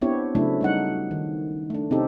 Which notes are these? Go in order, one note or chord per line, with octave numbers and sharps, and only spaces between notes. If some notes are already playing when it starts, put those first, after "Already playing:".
B3 C4 D4 E4 G4 C#5
C#3 F#3 A3 C#4 D4 E4
G3 D#4 F#5
D#3
A3 D4
C3 C4 C#4 D#4 G4 A4